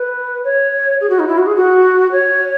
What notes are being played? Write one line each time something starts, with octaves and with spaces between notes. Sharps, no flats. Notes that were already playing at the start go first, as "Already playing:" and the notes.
Already playing: B4
C#5
G#4
F#4
D#4
E4
F#4
G#4
F#4
C#5